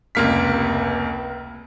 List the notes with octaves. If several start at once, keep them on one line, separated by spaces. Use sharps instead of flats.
F1 C#2 C3 A#3 F6 B6